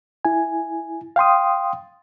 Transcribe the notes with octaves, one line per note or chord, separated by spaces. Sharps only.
E4 G#5
F5 G5 C6 D#6